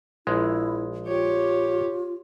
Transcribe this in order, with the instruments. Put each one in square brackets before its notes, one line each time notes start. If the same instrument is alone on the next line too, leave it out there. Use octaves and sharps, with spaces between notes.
[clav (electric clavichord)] A#1 G#3 [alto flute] E4
[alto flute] F4 [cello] G4 C#5